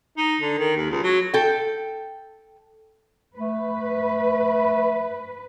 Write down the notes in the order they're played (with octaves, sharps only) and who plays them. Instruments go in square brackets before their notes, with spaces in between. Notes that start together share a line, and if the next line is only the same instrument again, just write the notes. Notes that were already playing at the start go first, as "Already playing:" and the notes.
[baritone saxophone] D#4
D3
D#3
D#2
C#2
F#3
[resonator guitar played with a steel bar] A4 G5
[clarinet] A3 [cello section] B4